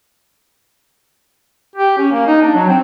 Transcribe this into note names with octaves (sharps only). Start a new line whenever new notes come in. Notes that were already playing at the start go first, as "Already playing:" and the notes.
G4
C#4
A#3
D#4
D4
F#3
C4